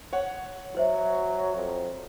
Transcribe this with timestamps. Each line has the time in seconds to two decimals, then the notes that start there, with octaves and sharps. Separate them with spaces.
0.13 C#5 F#5
0.75 F#3 F#4 C5 E5
1.56 F2